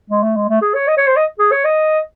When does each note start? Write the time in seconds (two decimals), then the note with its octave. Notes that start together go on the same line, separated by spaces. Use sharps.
0.10 G#3
0.23 A3
0.36 G#3
0.49 A3
0.62 G#4
0.75 C#5
0.88 D#5
0.97 C#5
1.07 C5
1.16 D#5
1.39 G#4
1.52 C#5
1.65 D#5